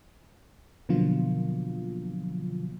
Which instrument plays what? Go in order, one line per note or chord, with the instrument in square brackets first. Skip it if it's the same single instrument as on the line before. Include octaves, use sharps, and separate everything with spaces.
[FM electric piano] B2 D3 F3 F#3 A#3 F4